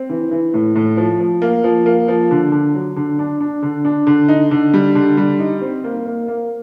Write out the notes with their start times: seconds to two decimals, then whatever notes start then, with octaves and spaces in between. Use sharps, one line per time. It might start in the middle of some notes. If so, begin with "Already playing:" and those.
Already playing: C4
0.10 E3
0.31 E3
0.54 A2
0.76 A2
0.97 F3
1.20 F3
1.42 A#3
1.64 F3
1.86 A#3
2.08 F3
2.31 D3
2.52 D3
2.74 F#3
2.96 D3
3.19 D4
3.41 D4
3.63 D3
3.85 D4
4.07 D3
4.28 D#4
4.51 D3
4.74 G3
4.95 D3
5.17 G3
5.39 D#4
5.62 C4
5.84 A#3
6.06 A#3
6.28 A#3